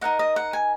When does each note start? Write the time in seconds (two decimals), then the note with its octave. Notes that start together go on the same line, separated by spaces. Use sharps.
0.01 D#4 A#4 D#5 F#5
0.19 D#5
0.36 F#5
0.53 G#5